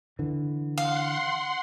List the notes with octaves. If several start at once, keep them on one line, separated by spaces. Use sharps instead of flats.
D3 E3
F5 F#5 C6